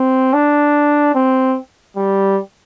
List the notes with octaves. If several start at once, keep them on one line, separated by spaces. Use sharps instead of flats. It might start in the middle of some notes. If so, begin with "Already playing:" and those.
Already playing: C4
D4
C4
G3